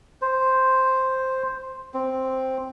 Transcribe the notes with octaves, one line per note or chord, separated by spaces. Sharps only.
C5
C4